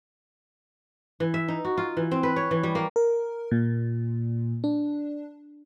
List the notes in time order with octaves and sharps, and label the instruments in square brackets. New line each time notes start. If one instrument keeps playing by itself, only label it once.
[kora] E3
E5
D#4
F#4
F4
E3
C4
B4
C#5
E3
G3
A#3
[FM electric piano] A#4
A#2
D4